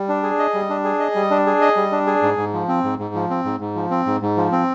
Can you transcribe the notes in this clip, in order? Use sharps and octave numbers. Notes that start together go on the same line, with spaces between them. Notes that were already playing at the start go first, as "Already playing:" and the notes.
Already playing: G3
D4
G#4
D#5
G3
D4
G#4
D#5
G3
D4
G#4
D#5
G3
D4
G#4
G#2
G#2
F3
C4
G#2
G#2
F3
C4
G#2
G#2
F3
C4
G#2
G#2
F3
C4